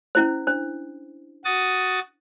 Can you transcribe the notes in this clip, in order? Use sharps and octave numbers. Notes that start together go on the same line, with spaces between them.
C#4 E4 C5
D4 C5
F#4 D#6 A6